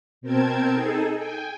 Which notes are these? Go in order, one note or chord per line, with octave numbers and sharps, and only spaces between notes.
B2 C4 A#4 G5 A5 G#6
D#4 G#4 A4
G5 G#5